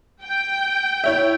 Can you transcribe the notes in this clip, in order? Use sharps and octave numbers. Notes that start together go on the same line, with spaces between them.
G5
E4 C#5 E5